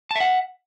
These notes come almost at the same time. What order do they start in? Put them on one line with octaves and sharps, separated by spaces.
A5 E5 F#5